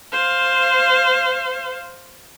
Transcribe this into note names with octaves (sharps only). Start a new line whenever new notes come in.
C5 F5